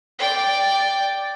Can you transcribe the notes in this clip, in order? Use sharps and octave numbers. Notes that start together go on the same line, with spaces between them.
D5 G5